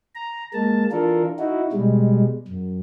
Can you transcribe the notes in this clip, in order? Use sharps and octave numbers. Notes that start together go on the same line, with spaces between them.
A#5
G#3 A#3 A5
E3 D4 F4 A4 A#4
D#4 E4 F#4
B2 G3 G#3
F#2